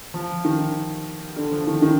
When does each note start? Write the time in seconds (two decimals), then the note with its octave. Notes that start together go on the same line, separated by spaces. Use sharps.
0.14 F3
0.45 D#3
1.36 D3
1.52 F3
1.67 D#3
1.82 D#3